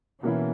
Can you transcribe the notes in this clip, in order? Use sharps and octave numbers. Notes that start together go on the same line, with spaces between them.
B2 E3 A#3 C#4 E4